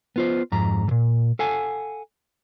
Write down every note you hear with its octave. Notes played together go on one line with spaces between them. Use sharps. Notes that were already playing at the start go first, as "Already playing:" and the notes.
B3 F4 C5
F2 G#2 A#5
D2 A#2
A4 F5 F#5 G#5